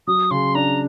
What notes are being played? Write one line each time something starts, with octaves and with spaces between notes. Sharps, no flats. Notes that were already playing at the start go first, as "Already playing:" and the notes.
F#3 D#6
C#3 C6
D4 A#5